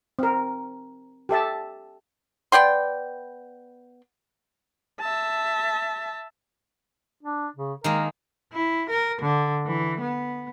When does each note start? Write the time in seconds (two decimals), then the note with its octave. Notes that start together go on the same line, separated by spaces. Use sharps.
0.19 C4 A#4
1.29 G4 A4 E5 A5
2.52 B3 D5 G5 C6
5.00 E5 A5
7.23 D4
7.56 C#3
7.84 D#3 G#3 A#3 A#4
8.53 E4
8.90 A#4
9.21 D3
9.66 E3
10.00 B3